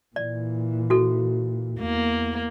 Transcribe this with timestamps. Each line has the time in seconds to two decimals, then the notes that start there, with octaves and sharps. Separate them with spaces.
0.16 A#2 E3 D5
0.90 F#4 A4
1.81 E2 A#3